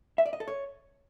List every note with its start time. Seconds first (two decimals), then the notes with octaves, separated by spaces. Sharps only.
0.18 E5
0.26 D5
0.33 D#5
0.40 A4
0.48 C#5